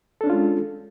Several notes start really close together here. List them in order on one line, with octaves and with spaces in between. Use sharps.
A4 D4 C#4 F4 G#3